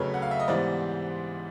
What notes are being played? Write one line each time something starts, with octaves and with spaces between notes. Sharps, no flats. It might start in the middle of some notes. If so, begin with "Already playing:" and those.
Already playing: F2 C#3 F#3 A3 B4 C#5
F#5
F5
E5
D#5
G#2 E3 G3 B3 C5 D5